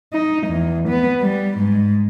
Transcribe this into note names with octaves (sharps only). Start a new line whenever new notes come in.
D#4
E2
B3
G3
G#2